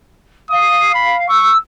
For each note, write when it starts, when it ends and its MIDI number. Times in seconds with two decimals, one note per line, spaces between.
0.50 1.25 77
0.50 0.90 87
0.94 1.16 83
1.29 1.52 85
1.29 1.55 88